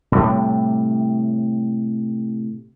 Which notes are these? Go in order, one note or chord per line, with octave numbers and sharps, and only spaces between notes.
A2 C3 G3